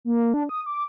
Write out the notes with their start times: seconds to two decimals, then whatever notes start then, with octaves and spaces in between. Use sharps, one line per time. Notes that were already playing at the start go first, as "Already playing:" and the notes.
0.05 A#3
0.34 D4
0.49 D#6
0.66 D6